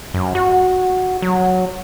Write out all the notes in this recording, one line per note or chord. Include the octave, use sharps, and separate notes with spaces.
F#2
F#4
F#3